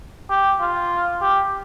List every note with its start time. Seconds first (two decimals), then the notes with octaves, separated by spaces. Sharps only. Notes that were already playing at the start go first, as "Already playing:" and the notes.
0.30 G4
0.61 F4
1.22 G4